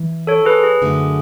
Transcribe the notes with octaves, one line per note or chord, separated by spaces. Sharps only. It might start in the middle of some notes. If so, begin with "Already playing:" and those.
Already playing: E3
A4 C#5
G#4 B4
G#4
F#2 D3 A3